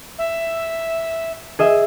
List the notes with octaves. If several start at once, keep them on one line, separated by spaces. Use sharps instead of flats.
E5
G#4 D#5 E5